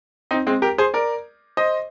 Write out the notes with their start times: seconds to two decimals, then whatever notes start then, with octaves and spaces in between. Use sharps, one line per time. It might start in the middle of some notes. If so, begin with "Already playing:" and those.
0.31 C4 D#4
0.47 G#3 C4
0.62 G4 A#4
0.78 G#4 C5
0.94 A#4 D5
1.57 C5 D#5